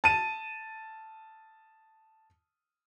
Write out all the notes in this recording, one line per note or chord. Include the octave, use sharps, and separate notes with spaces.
A5 D#7